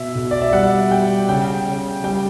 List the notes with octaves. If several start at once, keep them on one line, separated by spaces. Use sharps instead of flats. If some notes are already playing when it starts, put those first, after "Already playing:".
Already playing: B2 E5
B2
D5
E5
G3 F#5
G3 G5
C#3 G5
C#3
G3 G5